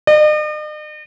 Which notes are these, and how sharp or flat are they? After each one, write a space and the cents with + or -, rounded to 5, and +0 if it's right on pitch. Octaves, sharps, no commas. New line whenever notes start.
D#5 -45